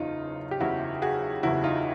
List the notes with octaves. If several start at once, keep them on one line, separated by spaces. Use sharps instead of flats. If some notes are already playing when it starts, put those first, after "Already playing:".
Already playing: F#1 E2 C#3 D#4 F4
G4
F#1 E2 C#3 E4 F#4
F#4 G#4
F#1 E2 C#3 E4 F#4
D#4 F4